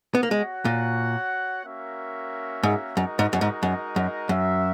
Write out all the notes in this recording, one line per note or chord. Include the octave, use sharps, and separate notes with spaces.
B3
A#3
G#3 F#4 C#5 F#5
A#2
A#3 C#4 F#4 A#4 E5
G#2
F#2 G#3 D#4 F#4 A#4 D#5
G#2
F#2
G#2
F#2
F#2
F#2 F#4 A#4 E5